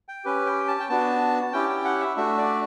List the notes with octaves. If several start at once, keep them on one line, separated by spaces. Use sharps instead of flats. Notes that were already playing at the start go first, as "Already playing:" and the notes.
G5
C#4 G4 B4
G5
A5
G5
B3 D4 F#4 A5
A5
C#4 E4 G4 G5
G5
F#5
E5
A3 D4 F#4 E5
D5